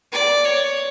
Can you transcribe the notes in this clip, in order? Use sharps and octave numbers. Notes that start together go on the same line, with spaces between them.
D5
C#5